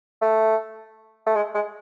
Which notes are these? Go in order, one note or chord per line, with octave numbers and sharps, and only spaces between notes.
A3
A3
G#3
G#3